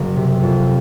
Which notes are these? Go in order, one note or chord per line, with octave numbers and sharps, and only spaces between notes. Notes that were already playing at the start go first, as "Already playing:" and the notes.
Already playing: F#1
C3
F2